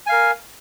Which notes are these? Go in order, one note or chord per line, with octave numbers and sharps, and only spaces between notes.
A#4 F5 G#5